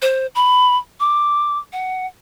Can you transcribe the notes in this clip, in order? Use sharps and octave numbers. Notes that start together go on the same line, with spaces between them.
C5
B5
D6
F#5